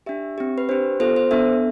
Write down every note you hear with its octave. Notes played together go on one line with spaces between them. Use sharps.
D4 G4 E5
C4 G4
B4
D4 G4 C5
B3 F4 A4 C5
C5
B3 D4 A4 E5